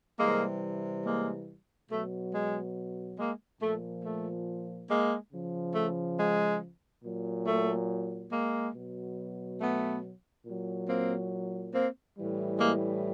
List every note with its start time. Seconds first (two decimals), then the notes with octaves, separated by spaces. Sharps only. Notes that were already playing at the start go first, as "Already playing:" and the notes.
0.19 C3 E3 G3 G#3 A#3
1.05 G#3 A#3
1.90 B2 F#3 A3
2.33 G#3
3.19 G#3 A#3
3.61 A#2 F3 A3
4.05 A3
4.90 G#3 A#3
5.33 C#3 F3
5.75 A3
6.19 G#3
7.04 A#2 F#3
7.47 A3
8.32 G#3 A#3
8.75 B2 F#3
9.61 A3 B3
10.46 A#2 F#3
10.89 A#3 C4
11.75 A#3 C4
12.18 A2 E3 G3
12.59 G#3 A#3